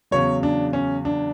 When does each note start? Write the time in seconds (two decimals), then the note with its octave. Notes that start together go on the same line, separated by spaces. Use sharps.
0.11 E2 C#3 F#3 C#5
0.43 D4
0.73 C#4
1.05 D4